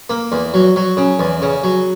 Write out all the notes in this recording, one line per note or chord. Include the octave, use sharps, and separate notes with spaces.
A#3
E2
F#3
F#3
C#3
E2
C#3
F#3